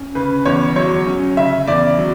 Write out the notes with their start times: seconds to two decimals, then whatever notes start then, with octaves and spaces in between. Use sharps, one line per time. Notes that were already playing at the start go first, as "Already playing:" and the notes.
Already playing: C#4
0.15 C#3 B4
0.45 E2 C#5
0.76 F#3 C#5
1.07 C#4
1.37 C#3 E5
1.68 E2 D5
1.98 F#3